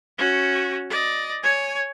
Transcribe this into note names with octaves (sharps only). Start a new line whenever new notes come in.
C#4 F#4
D5 D#5
C#5 G#5